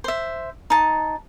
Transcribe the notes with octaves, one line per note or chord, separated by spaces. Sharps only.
C5 E5
D#4 A5